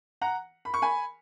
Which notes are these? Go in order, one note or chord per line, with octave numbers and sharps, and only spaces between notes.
F#5 A#5
B5
C#6
G#5 B5